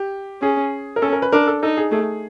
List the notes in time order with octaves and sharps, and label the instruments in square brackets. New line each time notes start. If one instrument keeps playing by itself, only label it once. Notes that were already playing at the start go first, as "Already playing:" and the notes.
Already playing: [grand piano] G4
[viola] C#4 [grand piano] G#4
[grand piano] A#4
[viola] C#4 [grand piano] A4
[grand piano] A#4
B4
[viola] D4 [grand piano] A#4
[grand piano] A4
[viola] D#4 [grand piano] A4
[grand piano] G#4
[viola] A3 [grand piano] G#4